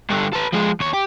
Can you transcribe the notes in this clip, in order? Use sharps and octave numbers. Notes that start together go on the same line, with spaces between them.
G2 D3
A4 B4
F3 G#3
D#2 C#5
G4